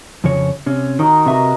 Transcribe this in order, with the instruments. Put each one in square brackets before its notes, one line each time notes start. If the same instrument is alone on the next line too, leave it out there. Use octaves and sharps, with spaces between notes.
[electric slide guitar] F2 C#3 C#5
C3 C#4
[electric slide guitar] D#3 [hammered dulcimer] F#4 D#5 A#5
[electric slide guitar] C3 E5 [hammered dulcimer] F#4 A#4 B4